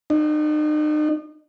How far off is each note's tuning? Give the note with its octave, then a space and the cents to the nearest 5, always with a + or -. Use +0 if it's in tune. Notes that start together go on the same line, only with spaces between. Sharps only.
D#4 -40